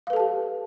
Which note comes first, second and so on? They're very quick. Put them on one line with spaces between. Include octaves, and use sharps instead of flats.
F5 B4 A4 A5 G4